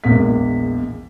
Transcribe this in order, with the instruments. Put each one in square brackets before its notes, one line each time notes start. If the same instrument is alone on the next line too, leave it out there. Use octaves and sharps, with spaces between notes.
[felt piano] A#1 E2 G#3 A#3 B6